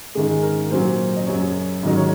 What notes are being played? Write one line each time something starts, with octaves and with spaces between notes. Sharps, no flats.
G#2 D#3 G#3 G#4
A#4
A#2 F#3 C5
D#5
F#2 C#3 F#3 C#5
G#2 D#3 F#3 D#5
C#5